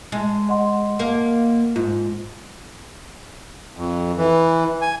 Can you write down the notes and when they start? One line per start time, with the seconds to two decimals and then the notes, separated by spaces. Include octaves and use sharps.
0.12 G#3
0.49 D#5 F#5 C6
0.99 A#3 A#4
1.76 G#2 F4
3.76 F2
4.17 E3
4.82 G#5